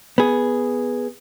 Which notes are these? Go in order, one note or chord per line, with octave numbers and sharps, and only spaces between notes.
B3 G#4